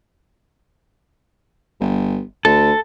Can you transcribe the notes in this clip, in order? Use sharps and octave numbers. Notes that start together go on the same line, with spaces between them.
G1
D2 A4